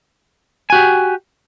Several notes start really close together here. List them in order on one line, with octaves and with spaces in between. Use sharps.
G#5 F#4 G4